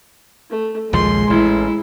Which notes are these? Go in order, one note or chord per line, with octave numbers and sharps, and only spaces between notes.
A3
A#1 D#2 F3 G#3 C6
A1 E4